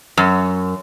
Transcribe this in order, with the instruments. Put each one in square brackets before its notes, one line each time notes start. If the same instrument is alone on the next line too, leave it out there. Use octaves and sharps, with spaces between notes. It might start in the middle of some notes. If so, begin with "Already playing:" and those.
[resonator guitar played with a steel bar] F#2